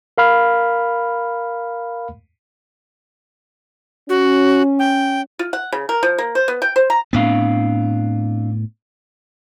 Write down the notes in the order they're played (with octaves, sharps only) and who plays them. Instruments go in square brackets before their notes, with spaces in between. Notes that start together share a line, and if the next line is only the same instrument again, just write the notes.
[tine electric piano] A#4 F5 B5 F6
[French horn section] C#4 [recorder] F#4
[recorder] G5
[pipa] F4
F#5
C#3
A#4
F3
A#3
C5
B3
G5
C5
A#5
[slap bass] A2 B3 [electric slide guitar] C4 D4 F5